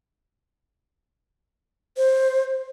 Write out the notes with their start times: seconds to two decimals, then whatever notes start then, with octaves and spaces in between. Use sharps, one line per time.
1.97 C5